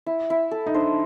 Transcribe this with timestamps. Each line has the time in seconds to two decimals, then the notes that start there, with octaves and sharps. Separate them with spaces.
0.06 E4
0.30 E4
0.51 A4
0.66 D#4
0.74 D4 C5